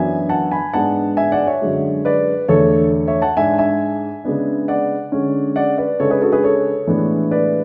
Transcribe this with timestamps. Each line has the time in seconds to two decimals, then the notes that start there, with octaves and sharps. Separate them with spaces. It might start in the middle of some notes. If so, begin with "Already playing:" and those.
Already playing: F#2 E3 B3 D4 E5 G#5
0.29 F#5 A5
0.51 G#5 B5
0.73 G#2 G#3 B3 D4 F#5 A5
1.17 E5 G#5
1.32 D5 F#5
1.47 C#5 E5
1.62 F#2 D3 G#3
2.05 B4 D5
2.48 E2 D3 A3 A4 C#5
3.07 C#5 E5
3.22 F#5 A5
3.37 G#2 G#3 D4 E5 G#5
3.59 E5 G#5
4.24 C#3 G#3 B3 D4
4.68 D5 F#5
5.12 D3 G#3 C#4
5.56 D5 F#5
5.78 B4 D5
6.00 C#3 G#3 D4 A4 C#5
6.10 G#4 B4
6.21 F#4 A4
6.32 G#4 B4
6.44 A4 C#5
6.87 A2 E3 G#3 B3 D4
7.31 B4 D5